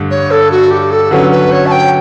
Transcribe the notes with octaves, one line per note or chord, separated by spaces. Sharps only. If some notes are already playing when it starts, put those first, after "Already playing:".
Already playing: G2 D3 A3 D4
C#5
A4
F#4
G4
A4
D3 F#3 C#4 B4
B4
C#5
A5
G5